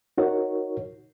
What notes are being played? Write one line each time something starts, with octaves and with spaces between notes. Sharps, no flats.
D#4 F#4 A#4 C#5